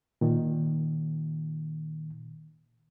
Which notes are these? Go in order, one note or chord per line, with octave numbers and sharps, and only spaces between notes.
A#2 D#3